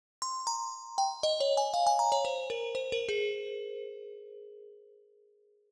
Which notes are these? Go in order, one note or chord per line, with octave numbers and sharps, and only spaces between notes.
C6
A#5
G5
D#5
C#5
G#5
F5
G#5
A#5
C#5
C5
A#4
C5
A#4
G#4